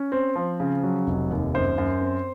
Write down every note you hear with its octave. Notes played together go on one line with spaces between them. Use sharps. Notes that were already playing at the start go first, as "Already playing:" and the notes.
Already playing: C#4
C4
F3
C#3
F#3
F1
D#2
F#2 C5
F#2
C4